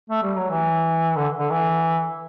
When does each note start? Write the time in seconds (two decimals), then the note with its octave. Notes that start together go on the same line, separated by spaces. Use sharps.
0.10 A3
0.23 G3
0.36 F#3
0.50 E3
1.16 D3
1.38 D3
1.50 E3